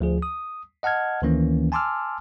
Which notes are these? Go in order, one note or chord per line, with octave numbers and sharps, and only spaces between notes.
D2 F3 G#4
D#6
D#5 F#5 A5 F6 G#6
D2 D#3 E3 A#3 C#4
G#5 A5 C6 D6 E6 F6